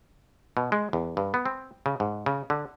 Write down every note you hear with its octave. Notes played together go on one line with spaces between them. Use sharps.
B2
G#3
E2
G2
B3
C4
C#3
G#2
C#3
D3